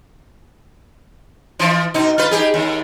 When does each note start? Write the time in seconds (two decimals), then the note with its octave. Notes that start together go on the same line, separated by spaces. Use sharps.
1.59 E3 F3
1.94 B2 D#4
2.18 F4 B4
2.31 D#4 G4 G#4
2.54 D#2